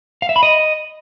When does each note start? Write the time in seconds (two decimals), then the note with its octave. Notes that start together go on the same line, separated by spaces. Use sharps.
0.22 F5
0.29 E5
0.36 B5
0.43 D#5